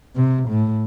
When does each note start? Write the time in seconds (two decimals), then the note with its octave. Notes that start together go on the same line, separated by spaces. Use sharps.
0.15 C3
0.48 A2